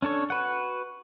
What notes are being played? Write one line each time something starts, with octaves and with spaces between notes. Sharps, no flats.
C#4 D4 A4 C#5
F#4 B4 F#5